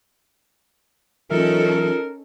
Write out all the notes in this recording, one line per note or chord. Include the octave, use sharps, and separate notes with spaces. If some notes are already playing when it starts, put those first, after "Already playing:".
E3 F#3 C#4 D#4 F4 A4 A#4 E5